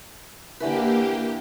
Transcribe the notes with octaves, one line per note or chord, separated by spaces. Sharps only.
D3 E3 A#3 G4 B4